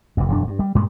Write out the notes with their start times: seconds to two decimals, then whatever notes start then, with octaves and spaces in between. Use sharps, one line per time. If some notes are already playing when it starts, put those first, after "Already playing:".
0.17 F#1 F2
0.29 E1 F#2 D4
0.47 G2
0.59 G3
0.75 G2 A#2 G3 G#3